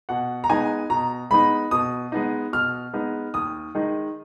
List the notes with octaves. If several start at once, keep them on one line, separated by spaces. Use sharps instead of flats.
B2 F#5
A#5
G#3 B3 D#4 G#5
B2 A#5
G#3 B3 D#4 B5
B2 D#6
G#3 B3 D#4
B2 F6
G#3 B3 D#4
D#2 D#6
D#3 G#3 D#4